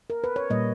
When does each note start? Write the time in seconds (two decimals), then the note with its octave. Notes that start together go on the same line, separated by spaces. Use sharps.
0.10 A#4
0.24 B4
0.36 C#5
0.50 A#2 G3 A#3 D#5